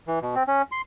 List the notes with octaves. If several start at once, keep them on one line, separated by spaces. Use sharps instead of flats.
E3
B2
C4
C#4
C6